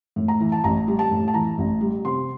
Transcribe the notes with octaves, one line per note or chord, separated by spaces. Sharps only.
A2
A#5
E3
A5
A1 A#5
G3
A5
A2
A5
E3 A#5
A1
G3
C3 C6